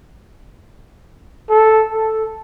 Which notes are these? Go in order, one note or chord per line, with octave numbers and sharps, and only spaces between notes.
A4
A4